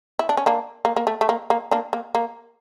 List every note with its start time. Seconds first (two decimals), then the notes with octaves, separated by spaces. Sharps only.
0.19 E4
0.29 D4
0.37 C#4
0.46 A#3 D4
0.85 A#3
0.96 A#3
1.07 A3
1.21 A3
1.29 A#3
1.50 A#3
1.71 A#3 D4
1.93 A#3
2.15 A#3